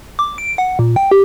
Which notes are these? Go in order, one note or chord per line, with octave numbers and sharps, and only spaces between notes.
D6
D7
F#5
A#2
G5
G4